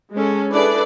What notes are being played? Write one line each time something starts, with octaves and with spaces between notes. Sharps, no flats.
G#3 C#4 A4
D4 E4 G#4 A4 B4 D5